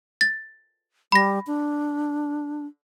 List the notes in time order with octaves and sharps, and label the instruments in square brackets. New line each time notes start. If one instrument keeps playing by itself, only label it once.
[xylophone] A6
[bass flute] G3 [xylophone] B5 A#6
[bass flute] D4